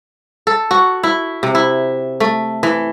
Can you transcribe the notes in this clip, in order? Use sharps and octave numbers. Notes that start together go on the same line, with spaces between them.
A4
F#4
E4
C3
E4
A3
E3